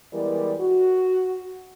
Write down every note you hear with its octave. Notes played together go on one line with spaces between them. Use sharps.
E3 G3 G#3 B3 A#4 D5
F#4